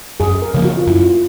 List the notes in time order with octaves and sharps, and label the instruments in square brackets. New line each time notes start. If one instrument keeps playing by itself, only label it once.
[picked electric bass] F#2 [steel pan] G#4
[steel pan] A#4
[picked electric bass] C#3 F3 A#3
[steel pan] F#4
F4
[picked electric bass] F#2 [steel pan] E4
[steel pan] F4